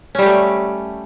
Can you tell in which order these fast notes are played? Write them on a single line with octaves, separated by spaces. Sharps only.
C#4 G3 G4 A3